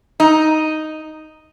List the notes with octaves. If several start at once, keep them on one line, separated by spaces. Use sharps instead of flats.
D#4